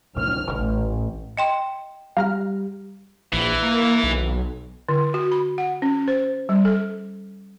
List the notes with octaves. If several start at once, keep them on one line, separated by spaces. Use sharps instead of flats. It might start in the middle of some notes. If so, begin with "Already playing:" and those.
F6
A1
D#5 G5 C6
G3 F5 A#5 F6
A#1 E3
A#3
B1
D3
F#4
B5
F#5
C#4
C5
G3
A4